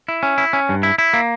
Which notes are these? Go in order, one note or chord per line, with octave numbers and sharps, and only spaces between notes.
E4
C#4
E4
C#4
G2
E4
E4
A#3